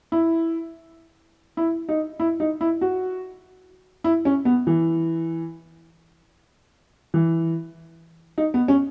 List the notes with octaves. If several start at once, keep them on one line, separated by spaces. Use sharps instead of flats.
E4
E4
D#4
E4
D#4
E4
F#4
E4
C#4
B3
E3
E3
D#4
B3
C#4